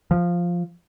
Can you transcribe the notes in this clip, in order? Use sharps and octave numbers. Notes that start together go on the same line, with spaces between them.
F3